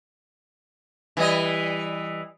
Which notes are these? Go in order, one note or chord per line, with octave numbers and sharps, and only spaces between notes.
E3 G3 D#5